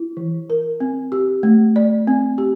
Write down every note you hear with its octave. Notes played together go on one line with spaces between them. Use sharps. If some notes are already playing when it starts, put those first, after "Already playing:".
Already playing: E4
E3
A#4
C4
G4
A3
D5
C4
G4